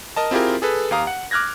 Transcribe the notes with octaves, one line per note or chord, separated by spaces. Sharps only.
A#4 D#5 A5
C4 E4 F4 G4 G#4 A#4
G#4 A4 B4
D#2 G4 F5 A#5 D#6
F#5
D6 F6 F#6 G#6 A#6